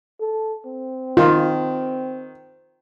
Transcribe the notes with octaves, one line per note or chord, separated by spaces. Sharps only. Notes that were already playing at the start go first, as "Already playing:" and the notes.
A4
C4
D#3 F4